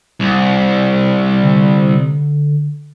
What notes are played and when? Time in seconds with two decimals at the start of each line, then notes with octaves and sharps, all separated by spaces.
0.20 C2
1.42 D3